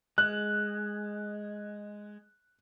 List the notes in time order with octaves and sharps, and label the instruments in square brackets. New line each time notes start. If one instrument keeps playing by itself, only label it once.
[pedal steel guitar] G#3 [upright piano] F#6